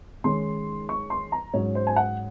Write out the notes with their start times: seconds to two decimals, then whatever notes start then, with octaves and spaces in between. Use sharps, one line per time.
0.24 D#3 G#3 C#4 C6
0.89 C#6
1.10 C6
1.32 A#5
1.54 G#2 F#3 C#4 C#5
1.75 C5
1.87 G#5
1.96 F#5